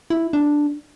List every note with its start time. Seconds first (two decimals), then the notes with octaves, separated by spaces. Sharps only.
0.10 E4
0.33 D4